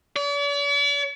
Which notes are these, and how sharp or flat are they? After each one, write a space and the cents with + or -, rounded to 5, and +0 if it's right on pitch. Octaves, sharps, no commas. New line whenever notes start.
D5 -45